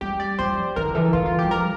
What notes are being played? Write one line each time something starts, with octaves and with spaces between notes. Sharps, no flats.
G3 G4
D5
F3 C5
E3 A#4
D3
E3 A4
E3 F4
F4
G3 G4
F3 A#4